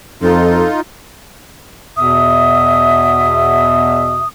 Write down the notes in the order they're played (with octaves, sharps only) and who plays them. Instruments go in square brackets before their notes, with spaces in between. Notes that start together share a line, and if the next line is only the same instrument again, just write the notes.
[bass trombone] F2 [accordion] D#4 F4 [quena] A4
[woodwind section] E2 B2 E5 [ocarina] D#6